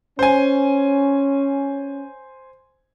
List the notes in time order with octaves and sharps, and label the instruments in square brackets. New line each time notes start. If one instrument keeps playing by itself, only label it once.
[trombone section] C#4 [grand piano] C5 G#5